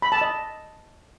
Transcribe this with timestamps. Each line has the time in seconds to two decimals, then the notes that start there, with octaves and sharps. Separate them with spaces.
0.02 B5
0.12 A5
0.21 D#5